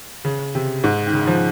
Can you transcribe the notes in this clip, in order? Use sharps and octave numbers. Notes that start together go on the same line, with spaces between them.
C#3
C3
G#2
D#3
C#3
D#3
F3